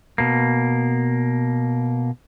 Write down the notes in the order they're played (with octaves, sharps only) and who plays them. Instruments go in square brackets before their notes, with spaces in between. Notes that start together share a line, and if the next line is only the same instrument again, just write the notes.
[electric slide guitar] B2 A#3